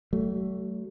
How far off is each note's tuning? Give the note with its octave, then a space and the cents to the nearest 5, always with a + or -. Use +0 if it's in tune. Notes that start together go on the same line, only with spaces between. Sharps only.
F#3 +45 A3 +0